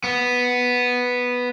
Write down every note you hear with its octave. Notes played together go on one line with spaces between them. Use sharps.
B3